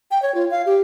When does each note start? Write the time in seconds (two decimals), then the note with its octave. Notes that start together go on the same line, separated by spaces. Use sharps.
0.11 G5
0.22 C#5
0.35 F4
0.51 F5
0.66 G4